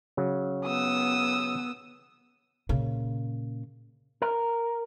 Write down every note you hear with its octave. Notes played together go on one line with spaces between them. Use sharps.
C#3 F#3
B3 D#6 E6
A#2 C#3
A#4